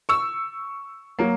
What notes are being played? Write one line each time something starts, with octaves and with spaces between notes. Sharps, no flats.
C#6 E6
F#3 A#3